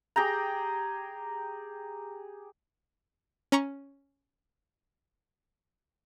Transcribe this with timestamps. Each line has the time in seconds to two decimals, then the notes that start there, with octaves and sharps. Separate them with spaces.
0.16 G4 G#4 G5 A#5
3.52 C#4 A#5 C#6